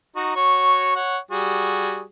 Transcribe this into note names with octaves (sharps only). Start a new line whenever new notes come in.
D#4 F#4
F#4 C#5 C#6
C#5 F#5
G3 F#4 G#4